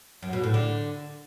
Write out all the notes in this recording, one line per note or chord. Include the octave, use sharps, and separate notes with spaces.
F#2
B2
A2
D3